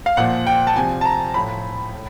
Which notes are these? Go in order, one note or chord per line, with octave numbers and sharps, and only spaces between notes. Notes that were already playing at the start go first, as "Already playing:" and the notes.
F5
A#2 F3 F#5
G5
A5
C3 F3 G#5
A5
A#5
A2 F3 B5
A2